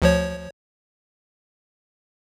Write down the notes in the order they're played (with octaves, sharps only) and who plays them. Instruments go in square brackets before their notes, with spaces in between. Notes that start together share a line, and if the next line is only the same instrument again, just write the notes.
[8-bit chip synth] D2 F3 C#5